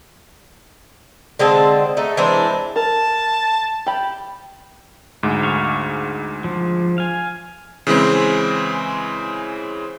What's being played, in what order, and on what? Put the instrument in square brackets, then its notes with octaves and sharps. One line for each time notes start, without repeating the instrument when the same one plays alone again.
[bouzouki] D3 G#3 C4 A5
A3 D#4
E3 G#3 C4 D4
[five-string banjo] A#4 [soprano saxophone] A5
[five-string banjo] G4 B5
[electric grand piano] D2 G#2
[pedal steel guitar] F5 C#6
F3
F5 G#5
[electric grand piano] C#3 E3 G#3 C4